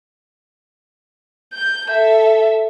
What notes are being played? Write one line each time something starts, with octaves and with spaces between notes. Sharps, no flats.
G6
A4 E5